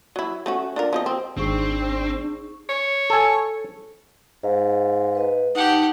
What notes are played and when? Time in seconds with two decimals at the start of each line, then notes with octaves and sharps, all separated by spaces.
0.16 F#3 E4
0.46 A3 C#4 F#4
0.76 D4 F4 A#4
0.93 F3 C4 D#5
1.06 C4
1.37 G#1 C4 D4 D#4 G#4 C#6
2.69 C#5
3.10 A4 G#5
4.44 G#2 F5
5.15 B4 D#5
5.55 D#4 G4 F#5 A5